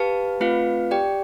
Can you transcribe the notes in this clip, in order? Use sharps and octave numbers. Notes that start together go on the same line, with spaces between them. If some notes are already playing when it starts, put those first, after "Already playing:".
Already playing: G4 B4 F5 A5
A3 C4 F4 B4 F5
G4 D5 G5